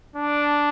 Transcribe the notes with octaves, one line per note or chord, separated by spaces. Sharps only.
D4